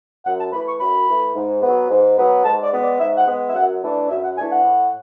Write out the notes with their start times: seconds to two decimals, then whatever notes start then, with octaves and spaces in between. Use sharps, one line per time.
0.25 F#2 F#5
0.38 A5
0.52 E3 A3 B5
0.66 C#6
0.79 F#2 B5
1.07 E3 A3
1.35 G#2
1.61 F#3 B3
1.89 G#2
2.17 F#3 B3
2.44 G#2 A5
2.63 D5
2.72 G#3 B3
2.80 D5
2.99 G#2 E5
3.17 F#5
3.26 G#3 B3
3.47 E5
3.54 F#2 F#5
3.82 E3 A3 D4
4.09 F#2 E5
4.22 F#5
4.36 E3 A3 D4 G#5
4.50 F#5
4.64 A2